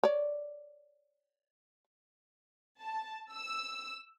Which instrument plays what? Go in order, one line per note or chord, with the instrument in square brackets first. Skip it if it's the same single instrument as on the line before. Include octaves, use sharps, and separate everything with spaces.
[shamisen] C#5 D5
[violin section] A5
E6